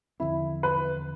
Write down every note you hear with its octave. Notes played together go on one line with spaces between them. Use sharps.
E2 D3 F3 C4 E4
B4